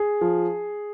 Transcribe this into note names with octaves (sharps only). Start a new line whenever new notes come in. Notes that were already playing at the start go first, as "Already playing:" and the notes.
Already playing: G#4
F3